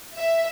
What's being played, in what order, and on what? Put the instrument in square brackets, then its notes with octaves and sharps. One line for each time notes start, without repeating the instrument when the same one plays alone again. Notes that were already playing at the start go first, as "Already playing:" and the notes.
[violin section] E5